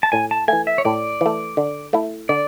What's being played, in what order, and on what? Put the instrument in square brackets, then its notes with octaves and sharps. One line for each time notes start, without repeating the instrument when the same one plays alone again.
[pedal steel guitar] A5
[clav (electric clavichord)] A2 [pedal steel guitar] G#5
[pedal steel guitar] A5
[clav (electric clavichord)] E3 A3 [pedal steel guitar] G#5
[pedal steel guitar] E5
C#5
[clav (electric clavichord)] A2 [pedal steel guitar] D5
[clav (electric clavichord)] E3 A3
D3
A3 E4
[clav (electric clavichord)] D3 [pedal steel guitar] D5